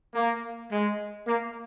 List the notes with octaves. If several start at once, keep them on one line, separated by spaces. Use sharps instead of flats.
A#3
G#3
A#3